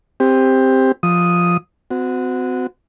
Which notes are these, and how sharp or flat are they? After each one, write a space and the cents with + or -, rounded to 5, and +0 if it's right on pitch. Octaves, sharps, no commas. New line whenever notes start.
C4 +0 G4 +15
F3 +0 D#6 +0
C4 -40 F#4 -10